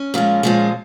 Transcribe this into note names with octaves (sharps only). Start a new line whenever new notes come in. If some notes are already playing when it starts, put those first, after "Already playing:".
Already playing: C#4
A#2 F3 G#3
A#2 F3 G#3